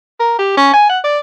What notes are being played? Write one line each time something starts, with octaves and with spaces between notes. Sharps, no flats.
A#4
G4
C#4
G#5
F#5
D5